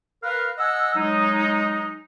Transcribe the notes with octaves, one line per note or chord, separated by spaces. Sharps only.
A#4 B4 F5
D#5 F#5 G#5 E6
F#3 G#3 D#4